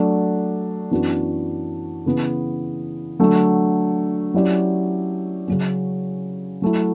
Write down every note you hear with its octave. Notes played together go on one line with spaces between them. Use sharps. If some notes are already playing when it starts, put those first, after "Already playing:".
Already playing: F#3 A3 D4
F#2 E3 B3 D4 F#4
C#3 E3 B3
D3 F#3 A3
F#3 C#4 E4 G4 D5
C#3 F#3 C#4
F#3 A3 E4